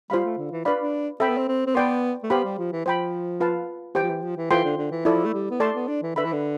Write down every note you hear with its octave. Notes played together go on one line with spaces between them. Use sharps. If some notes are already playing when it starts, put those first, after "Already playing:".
G3 F4 C5 F5 B5
A3
D3
E3
D4 B4 D5 F5 B5
D4
C4 A4 E5 G5 B5
B3
C4
C4
C4
B3 B4 D5 G5 C6
A3
B3 G4 C5 F5 B5
G3
F3
E3
F3 C5 G5 B5
F4 B4 F5 A5
E3 G4 C5 G5
F3
E3
F3
E3
E3 F4 A4 C5 G5 C6
D3
D3
E3
F3 E4 A4 D5
A3
G3
B3
A3 A4 D5 A5 C6
B3
D4
E3
D3 B4 E5 B5
E3
D3